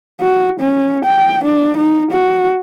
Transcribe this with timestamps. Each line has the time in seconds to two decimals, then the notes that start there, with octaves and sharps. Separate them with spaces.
0.21 F#4
0.60 C#4
1.05 G5
1.44 D4
1.77 D#4
2.11 F#4